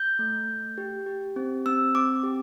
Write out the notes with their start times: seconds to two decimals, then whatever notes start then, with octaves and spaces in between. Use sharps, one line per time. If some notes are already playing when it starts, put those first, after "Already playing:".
Already playing: G6
0.19 A3
0.48 A3
0.78 G4
1.06 G4
1.36 C4
1.66 C4 E6
1.95 C4 D6
2.23 G4